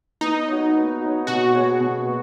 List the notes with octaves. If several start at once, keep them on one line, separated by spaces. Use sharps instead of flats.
B3 D#4
F#4 C#5
B3
F#4 C#5
B2 F#4
B3 G#4 C#5
B2
B3